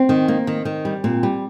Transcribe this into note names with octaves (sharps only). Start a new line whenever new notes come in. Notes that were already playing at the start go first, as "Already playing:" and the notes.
Already playing: C4
D#3
A#3
D#3
D#3
G3
A#2 C4
G3